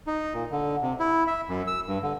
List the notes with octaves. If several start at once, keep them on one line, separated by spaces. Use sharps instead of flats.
D#4
A#2
D3
C3
E4
E5
F#2
E6
G2
D3